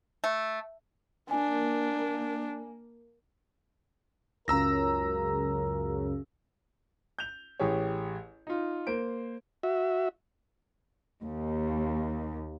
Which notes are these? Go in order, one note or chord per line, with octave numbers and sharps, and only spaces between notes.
A3
A#3 D4 G#5
C#2 F#2 C#3 A#4 A#5 E6 A#6
G6 F7
A1 G4 G#4 C#5
D#4 F4
A#3 C5 D7
F#4 E5
D#2